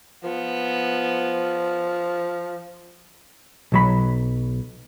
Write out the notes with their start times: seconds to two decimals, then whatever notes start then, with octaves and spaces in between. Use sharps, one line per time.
0.24 F3 B3
3.72 B1 F#3 B5